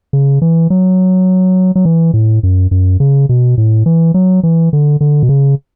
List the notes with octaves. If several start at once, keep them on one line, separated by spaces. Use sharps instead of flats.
C#3
E3
F#3
F#3
E3
A2
F#2
F#2
C#3
B2
A2
E3
F#3
E3
D3
D3
B2
C#3